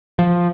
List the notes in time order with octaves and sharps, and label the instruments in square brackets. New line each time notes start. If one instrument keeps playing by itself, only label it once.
[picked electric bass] F3